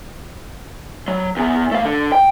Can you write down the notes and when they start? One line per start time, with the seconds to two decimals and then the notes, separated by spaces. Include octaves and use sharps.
1.08 F#3
1.37 E2 B3
1.72 A3 F5
1.85 D3
2.12 G5